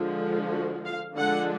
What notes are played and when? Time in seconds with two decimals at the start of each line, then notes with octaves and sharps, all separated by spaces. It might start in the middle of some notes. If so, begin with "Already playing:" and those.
Already playing: D3 F3 G#3
0.52 F#4
0.85 F5
1.16 D3 F3 G#3 D4 F#5